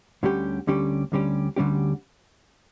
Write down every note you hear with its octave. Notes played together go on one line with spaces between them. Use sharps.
D2 D3 G3 C#4 G4
D2 D3 G3 C#4 G4
D2 D3 G3 C#4 G4
D2 D3 G3 C#4 G4